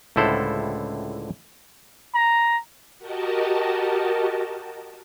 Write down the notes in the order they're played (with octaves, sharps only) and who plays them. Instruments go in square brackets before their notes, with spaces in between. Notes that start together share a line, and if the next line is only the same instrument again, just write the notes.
[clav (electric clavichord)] C#2 A2 D3 E4 A4 C5
[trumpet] A#5
[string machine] F#4 G4 A#4 D#5 A5